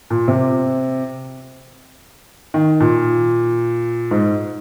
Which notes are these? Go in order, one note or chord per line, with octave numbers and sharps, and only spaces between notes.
A#2
C3
D#3
A#2
G#2